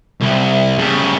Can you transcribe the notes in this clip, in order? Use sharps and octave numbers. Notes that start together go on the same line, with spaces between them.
C2
C#3 G3